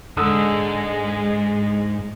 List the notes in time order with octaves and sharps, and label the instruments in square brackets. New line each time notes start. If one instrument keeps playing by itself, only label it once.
[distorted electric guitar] E2 G#2 [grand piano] D3 D#6 E6 [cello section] G#3 G#4